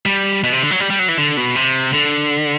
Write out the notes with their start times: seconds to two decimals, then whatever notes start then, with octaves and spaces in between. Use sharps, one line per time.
0.06 G3
0.44 B2
0.53 C3
0.62 D3
0.71 F#3
0.80 G3
0.90 G3
0.99 F#3
1.08 E3
1.18 D3
1.37 B2
1.56 C3
1.93 D3